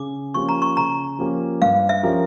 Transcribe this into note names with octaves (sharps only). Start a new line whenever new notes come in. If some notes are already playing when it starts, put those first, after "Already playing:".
Already playing: C#3 D6
F3 A#3 C#4 G4 C#6
A#5
C#6
C#3 A#5
F3 A#3 C#4 G4
G2 F5
E5
F3 C#4 G4 A#4